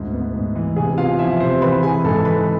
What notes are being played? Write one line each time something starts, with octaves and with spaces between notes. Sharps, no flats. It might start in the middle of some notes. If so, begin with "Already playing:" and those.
Already playing: D2 G#2
B3
G#2
E3
C3 G#4 G#5
B3 F4 F5
F3 E4 E5
C3 C4 C5
E3 B4 B5
E3 G#4 G#5
G#2 A4 A5
E3 B4 B5